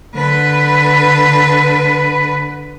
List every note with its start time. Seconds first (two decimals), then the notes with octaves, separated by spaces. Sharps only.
0.15 D3 B4